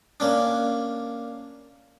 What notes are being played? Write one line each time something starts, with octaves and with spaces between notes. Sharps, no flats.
A#3 C#4 D4